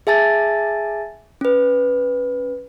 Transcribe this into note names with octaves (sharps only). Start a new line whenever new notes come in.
G#4 E5 G#5 A5 A6
C#4 B4